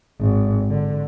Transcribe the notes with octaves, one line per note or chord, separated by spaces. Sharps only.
G#1
D3